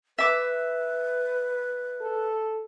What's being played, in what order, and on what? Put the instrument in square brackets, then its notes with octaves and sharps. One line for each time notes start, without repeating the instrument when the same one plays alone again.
[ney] B4 [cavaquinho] E5 D6
[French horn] A4